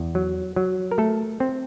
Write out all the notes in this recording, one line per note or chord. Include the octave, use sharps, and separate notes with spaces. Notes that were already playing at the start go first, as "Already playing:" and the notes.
Already playing: E2
F#3
F#3
A#4
A3 A4
C4